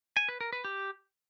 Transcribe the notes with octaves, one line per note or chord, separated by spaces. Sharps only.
G#5
B4
A#4
B4
G4